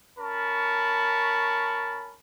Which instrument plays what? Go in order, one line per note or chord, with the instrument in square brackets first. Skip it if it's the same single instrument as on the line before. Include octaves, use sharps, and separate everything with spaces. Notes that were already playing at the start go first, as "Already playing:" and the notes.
[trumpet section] C#4 A#4 A5 B5 C#6